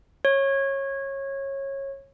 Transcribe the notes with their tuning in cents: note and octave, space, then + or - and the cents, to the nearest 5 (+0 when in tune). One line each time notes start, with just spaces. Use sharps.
C#5 -20